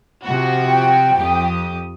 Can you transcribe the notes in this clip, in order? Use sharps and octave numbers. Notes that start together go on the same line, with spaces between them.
C3 F3 F#4
G5
F2 G4 D#6